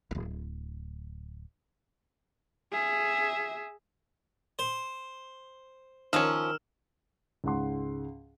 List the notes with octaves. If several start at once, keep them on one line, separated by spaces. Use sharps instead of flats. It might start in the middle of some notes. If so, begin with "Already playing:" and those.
D1 G#1
G#4 E5
C5
D#3 F3 C#4 D#4 E6 F6 E7
C#2 G#2 F#5 C6